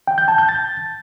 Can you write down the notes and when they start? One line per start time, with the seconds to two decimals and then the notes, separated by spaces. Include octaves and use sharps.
0.07 G5
0.18 G6
0.28 A5
0.38 G6
0.49 A6